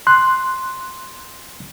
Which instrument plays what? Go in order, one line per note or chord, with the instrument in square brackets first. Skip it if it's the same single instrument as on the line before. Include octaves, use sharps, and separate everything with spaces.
[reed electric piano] C6 F#6